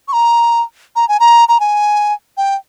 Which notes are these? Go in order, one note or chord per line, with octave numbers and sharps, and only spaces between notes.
C#6
A#5
A#5
G#5
A#5
A#5
G#5
G5